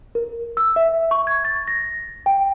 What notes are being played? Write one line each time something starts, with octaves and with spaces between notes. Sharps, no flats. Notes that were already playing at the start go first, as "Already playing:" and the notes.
A#4
E6
E5
C#6
G#6
A6
A#6
G5